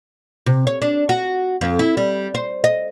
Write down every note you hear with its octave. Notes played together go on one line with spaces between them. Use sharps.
C3
C#5
D4
F#4
F2
E4
G3
C5
D#5